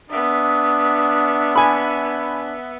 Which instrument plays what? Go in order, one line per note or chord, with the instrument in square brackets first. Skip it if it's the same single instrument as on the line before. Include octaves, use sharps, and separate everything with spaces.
[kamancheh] B3 E5 [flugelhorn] D4 [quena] D#6
[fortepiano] G#5 B5